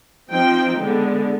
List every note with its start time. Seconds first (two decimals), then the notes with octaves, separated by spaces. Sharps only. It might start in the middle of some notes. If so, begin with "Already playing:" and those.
0.31 F3 C4 D#4 G5
0.80 D3 G#3 B3 D4